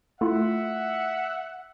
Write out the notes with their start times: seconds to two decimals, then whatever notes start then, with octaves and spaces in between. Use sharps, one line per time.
0.21 A3 E4 F4 E5 F#5